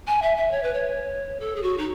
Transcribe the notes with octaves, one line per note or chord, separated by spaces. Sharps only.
G#5
E5
E5
C#5
B4
C#5
A4
G#4
F#4
D#4